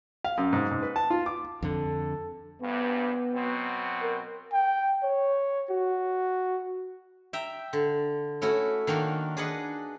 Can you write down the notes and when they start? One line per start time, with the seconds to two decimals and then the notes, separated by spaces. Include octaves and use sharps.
0.24 F5
0.38 F#2
0.53 G#2
0.71 G#2
0.82 B4
0.96 A5
1.10 F4
1.26 D6
1.62 F2 D3 A4
2.62 A#1 G2 B3
3.34 B2 F#3 C4
4.02 A#4
4.53 G5
5.03 C#5
5.70 F#4
7.33 E5 G5 A#5
7.73 D3
8.42 A3 C#4 E4 F#4
8.87 D#3 A#3 D4 F#4
9.37 D4 G#4 B4 D#5 F#5